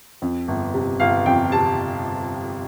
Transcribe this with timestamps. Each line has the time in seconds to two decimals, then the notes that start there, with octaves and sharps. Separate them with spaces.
0.22 F2
0.48 G1
0.74 C3
1.00 G1 F5
1.26 F2 G5
1.52 C3 A5